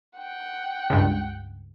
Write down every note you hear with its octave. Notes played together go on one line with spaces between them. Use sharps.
F#5 G5
C#2 G2